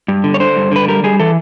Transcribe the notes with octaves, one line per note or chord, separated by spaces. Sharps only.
G2
D3
C#5
D3 C5
G2
D3 B4
G3 A#4
G3 G#4
E3 A4